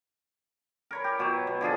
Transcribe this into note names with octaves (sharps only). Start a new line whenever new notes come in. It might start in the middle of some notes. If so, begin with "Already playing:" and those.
A#4 C#5 B5
G4
B2 F#3
B2
D3 F3 G#4 A4